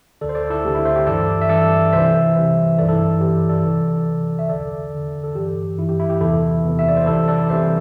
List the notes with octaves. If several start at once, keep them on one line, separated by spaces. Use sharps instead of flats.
D2 D3 A4 D5
C5
A4 D5
E4 A4
D2 D3 G4
E4
C5 E5
G4
G2 E3 A4 D5
E5
G2 E3 A4 D5
C2 C3 E3 C5 E5
C2 C3 E3
G2 E3 A4 D5
E4 A4
G2 E3 G4
A4 D5
C2 C3 E3
C2 C3 E3
E5
E2 D3 A4 D5
E2 D3
A4
G2 E3 G4
G2 E3 E4
G4
E4
G4
E2 C3 E3 E4 A4
E2 C3 E3
E5
D5
C5
C2 C3 E3 E4 A4
A4 D5
C2 C3 E3 C5 E5